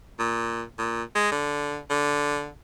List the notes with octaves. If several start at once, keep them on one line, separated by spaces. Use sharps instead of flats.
A#2
A#2
G#3
D3
D3